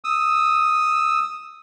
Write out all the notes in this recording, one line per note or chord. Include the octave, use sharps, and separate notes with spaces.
D#6 E6